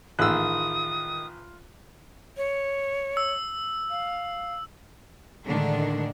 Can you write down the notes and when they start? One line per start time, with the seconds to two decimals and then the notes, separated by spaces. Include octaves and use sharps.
0.19 A1 D#3 F4 G#4 D#6 E6 F#6
2.37 C#5
3.17 E6
3.90 F5
5.46 A2 D3 D#3 G#3 D4